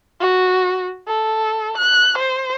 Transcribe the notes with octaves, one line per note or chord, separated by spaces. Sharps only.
F#4
A4
F#6
C5